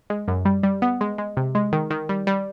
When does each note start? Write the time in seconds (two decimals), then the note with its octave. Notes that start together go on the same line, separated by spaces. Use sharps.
0.10 G#3
0.28 F#2
0.45 G3
0.63 G3
0.82 B3
1.01 G#3
1.18 G#3
1.37 C3
1.55 G#3
1.73 D#3
1.91 D#3
2.09 G3
2.27 G3